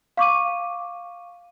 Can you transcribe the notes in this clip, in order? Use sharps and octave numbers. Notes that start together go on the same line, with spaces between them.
F5 C#6 D6 D#7